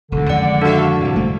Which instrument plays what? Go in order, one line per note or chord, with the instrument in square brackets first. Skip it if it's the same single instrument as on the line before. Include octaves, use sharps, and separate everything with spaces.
[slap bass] E1 D2 [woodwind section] D3
[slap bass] F2 D#3 G#3 [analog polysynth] D5 [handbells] F#5
[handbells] D4 F#4 [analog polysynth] A4 E5 F5
[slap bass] A2 F3 [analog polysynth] C3 G3
[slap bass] G1 A3 A#3